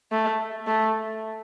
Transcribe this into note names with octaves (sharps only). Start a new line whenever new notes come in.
A3
A3